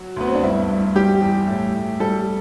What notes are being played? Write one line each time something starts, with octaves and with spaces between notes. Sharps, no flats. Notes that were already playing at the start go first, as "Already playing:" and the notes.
Already playing: F#3 F#4
D2 B3
C4
D4
G2 E4
G2
G3 G4
E2
A2
A2
G3 A4